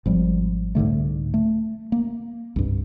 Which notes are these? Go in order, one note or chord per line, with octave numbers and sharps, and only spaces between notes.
G#1 F3 G3
C2 G#2 D3 A3
A3
A#3
C2 G2